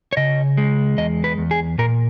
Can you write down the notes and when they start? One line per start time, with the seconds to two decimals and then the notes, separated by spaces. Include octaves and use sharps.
0.13 C#5
0.17 C#3 D#5
0.57 G#3
0.97 E2 D#5
1.24 B4
1.38 E2
1.51 G#4
1.78 A#2 A#4